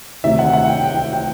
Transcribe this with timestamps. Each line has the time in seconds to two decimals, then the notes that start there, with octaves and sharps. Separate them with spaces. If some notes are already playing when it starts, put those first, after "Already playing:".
0.24 D2 C3 D#3 E5
0.39 F#5
0.53 F#5
0.68 G5
0.84 G5
1.13 G5